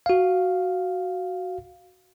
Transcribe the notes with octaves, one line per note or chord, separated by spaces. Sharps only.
F#4 F5